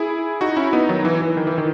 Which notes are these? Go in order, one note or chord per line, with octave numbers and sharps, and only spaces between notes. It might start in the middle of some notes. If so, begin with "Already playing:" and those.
Already playing: E4 G#4
D#4 F#4
C#4 E4
B3 D#4
D#3 F#3
E3
E3
D#3
E3
D#3